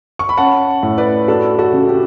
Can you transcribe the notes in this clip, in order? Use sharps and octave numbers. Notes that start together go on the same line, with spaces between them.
C#6
B5
C#4 F#5 A5
A2
B4 D5
D4 F#4 A4
F#4 A4
C#3
G4